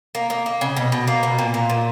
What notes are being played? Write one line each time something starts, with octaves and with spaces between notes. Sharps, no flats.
A#3
A#3
A#3
C#3
B2
B2
A#3
B2
A#2
A#3
A#2